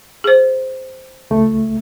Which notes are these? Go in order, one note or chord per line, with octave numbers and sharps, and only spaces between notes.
G#4 C5
C#2 A3